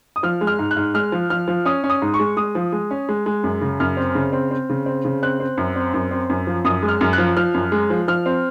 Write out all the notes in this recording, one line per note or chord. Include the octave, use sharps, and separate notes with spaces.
D#6
F3 F6
G#3
F6
G#2
F#6
G#2
G#3 F6
F3
F3 F6
F3
C#4 D#6
C#4
D#6
G#2
C#6
G#3
G#3 D#6
F3
G#3
C#4
G#3
G#3
F#2
C#3
F#2 F6
C4
C#3
C4
C4
C#3
C4
C#3
C4 F#6
C4
F#2
C4
F#2
C4
F#2
F3
F#2 D#6
G#3
F6
F#2 F6
F3 F#6
F3 F6
F#2
G#3
F3
F3 F6
C4